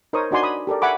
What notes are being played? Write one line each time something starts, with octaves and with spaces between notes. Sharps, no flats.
D#4 A#4 C5 C#5 C#6 D#6
D4 D#4 F#4 D5 G#5 C6
B5 D#6
G4 A4 A#4 D5
E5 F#5 G#5 B5 C#6 D6